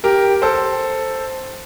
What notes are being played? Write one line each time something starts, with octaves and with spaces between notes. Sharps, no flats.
G4 A#4
A4 C5